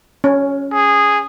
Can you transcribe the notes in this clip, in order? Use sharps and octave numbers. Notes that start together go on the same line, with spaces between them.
C#4
G#4